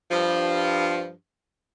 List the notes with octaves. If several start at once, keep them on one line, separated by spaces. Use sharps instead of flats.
G2 F3